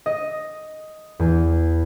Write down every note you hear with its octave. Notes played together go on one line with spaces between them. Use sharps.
D#5
E2